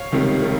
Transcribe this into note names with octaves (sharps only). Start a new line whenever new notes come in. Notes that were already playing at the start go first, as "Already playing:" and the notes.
Already playing: C#5 F5
C#2 C3 D#3 G3
D#3 G3